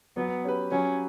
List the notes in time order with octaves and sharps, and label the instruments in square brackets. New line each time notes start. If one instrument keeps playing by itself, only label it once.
[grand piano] F#3 [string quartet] B3
[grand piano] C#4 G4 B4
[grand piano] F#3 [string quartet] C#4